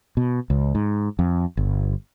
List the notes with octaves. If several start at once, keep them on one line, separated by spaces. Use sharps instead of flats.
B2
C#2
G#2
F2
G1